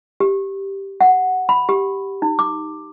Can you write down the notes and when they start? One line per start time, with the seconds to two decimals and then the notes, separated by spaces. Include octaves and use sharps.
0.20 G4
1.01 F#5
1.49 B5
1.69 G4
2.22 D#4
2.39 D6